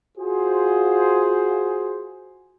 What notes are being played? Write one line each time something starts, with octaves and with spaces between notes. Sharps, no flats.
F4 F#4 G#4 C5